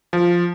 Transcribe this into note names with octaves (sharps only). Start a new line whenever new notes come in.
F3